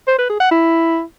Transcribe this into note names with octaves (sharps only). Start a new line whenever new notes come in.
C5
B4
G#4
F#5
E4